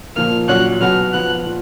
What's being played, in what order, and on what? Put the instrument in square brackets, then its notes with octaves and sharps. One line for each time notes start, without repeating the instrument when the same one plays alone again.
[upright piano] A#2 F3 A#3 [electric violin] F6
[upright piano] A#2 F#3 C#4 F#4 [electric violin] F#6
[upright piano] B2 F#3 B3 F#4 [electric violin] F6
[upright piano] F3 B3 F#4 [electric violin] F#6
[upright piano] A#2 F4